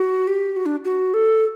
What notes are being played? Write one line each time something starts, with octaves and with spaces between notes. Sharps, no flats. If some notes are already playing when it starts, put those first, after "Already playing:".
Already playing: F#4
G4
F#4
D4
F#4
A4